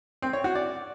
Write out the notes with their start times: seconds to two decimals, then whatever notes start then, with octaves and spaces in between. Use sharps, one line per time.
0.22 C4
0.33 C#5
0.44 F#4
0.55 D5